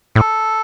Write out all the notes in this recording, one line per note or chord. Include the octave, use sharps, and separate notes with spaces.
A2 A4